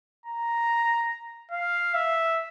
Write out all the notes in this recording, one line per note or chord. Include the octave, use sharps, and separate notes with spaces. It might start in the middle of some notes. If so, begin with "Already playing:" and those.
A#5
F5
E5